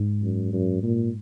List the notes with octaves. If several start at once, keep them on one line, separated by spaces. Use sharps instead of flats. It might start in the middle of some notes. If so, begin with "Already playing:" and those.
Already playing: G#2
F#2
F#2
A#2